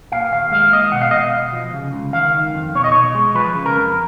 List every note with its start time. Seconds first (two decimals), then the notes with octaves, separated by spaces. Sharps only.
0.12 A#2 F5
0.32 D#2 F5
0.51 G#3 F5
0.72 D#2 D#5
0.92 B2 F#5
1.02 F5
1.11 B2 D#5
1.19 F5
1.34 B2
1.53 F3
1.74 C#3
1.93 C#2
2.13 D#3 F5
2.35 D#3
2.54 F2
2.75 B2 C#5
2.84 D#5
2.92 B2 C#5
3.15 G#3
3.35 F3 B4
3.56 C#3
3.66 A#4
3.75 F2